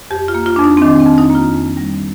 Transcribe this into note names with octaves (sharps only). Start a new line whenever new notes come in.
F2 G4
F4
A#3
F4
F2 D4
D#4
C4
D#3 D4
C4
F2
D#4
A#3
F4
F2
G3